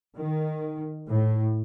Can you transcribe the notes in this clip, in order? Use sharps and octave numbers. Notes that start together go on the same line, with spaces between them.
D#3
A2